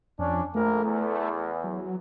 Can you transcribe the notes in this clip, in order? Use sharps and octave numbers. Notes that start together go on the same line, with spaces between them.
F2 C#4 D4
A#1 A3 A#3 A#4
E2
F#3